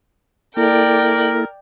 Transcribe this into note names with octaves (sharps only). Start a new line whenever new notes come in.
A#3 E4 A4 A#4 D5 G5